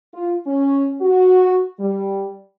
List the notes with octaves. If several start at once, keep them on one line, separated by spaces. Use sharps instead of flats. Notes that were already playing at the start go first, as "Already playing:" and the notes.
F4
C#4
F#4
G3